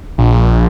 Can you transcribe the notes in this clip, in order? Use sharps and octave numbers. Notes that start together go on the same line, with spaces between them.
A#1